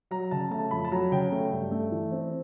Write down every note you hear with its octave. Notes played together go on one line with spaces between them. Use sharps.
F#3 A#5
C#3 A5
A3 A5
F2 B5
A5
F#3 A#5
C#3 G5
A3
G2
A3
E3
C4